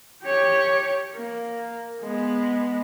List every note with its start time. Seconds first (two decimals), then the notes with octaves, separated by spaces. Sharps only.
0.23 G4 C#5
1.16 A#3
2.01 G#3 B3